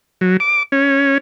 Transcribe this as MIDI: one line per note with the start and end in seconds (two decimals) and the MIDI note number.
0.21 0.37 54
0.40 0.63 86
0.72 1.18 61